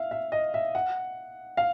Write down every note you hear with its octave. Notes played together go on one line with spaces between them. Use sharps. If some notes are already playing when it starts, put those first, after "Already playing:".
Already playing: E5 F5
E5
D#5
E5
F#5
F5